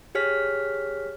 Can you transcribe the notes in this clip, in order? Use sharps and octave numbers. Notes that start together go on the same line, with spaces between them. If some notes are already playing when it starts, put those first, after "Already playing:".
G4 G#4 C#5 F6 B6